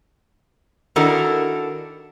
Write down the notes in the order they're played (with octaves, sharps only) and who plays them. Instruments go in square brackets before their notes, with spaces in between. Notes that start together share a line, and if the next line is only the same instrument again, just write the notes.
[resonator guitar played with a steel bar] D#3 D4 E4 F#4 A4 A#4